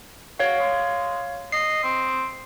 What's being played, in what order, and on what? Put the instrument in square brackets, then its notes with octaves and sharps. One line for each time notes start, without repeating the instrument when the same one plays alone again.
[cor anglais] F#4 [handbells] C#5 F5
[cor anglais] G#3
[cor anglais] D#5 [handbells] C7
[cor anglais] C4